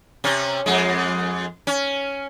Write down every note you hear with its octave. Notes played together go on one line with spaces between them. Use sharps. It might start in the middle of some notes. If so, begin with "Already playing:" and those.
C3 C#4
F2 G#3
C#4